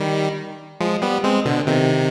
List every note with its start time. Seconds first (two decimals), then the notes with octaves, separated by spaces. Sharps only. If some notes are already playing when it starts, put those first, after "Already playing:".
Already playing: D#3 G3
0.80 F3 G#3
1.02 G3 B3
1.24 G#3 C4
1.45 B2 D3
1.67 C3 D#3